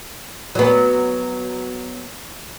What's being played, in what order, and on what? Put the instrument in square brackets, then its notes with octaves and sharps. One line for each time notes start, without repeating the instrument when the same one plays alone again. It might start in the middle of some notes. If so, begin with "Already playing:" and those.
[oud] F#3 B3